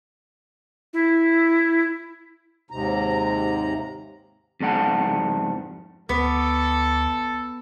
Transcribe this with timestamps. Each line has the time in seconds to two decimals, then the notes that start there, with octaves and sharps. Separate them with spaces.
0.93 E4
2.71 D#2 G#2 C3 A#5
4.60 F2 G#2 D4 F#5
6.09 D2 B3 A4 D6